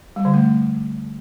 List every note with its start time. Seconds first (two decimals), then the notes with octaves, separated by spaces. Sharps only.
0.16 G3
0.25 D3
0.34 A3